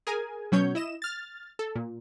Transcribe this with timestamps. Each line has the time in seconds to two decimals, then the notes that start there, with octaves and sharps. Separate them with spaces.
0.07 G#4 A#4 G#5
0.52 B2 F#3 C#4 C#5 G6
0.75 E4 D#5 E7
1.02 F6 A6
1.59 A4
1.76 A#2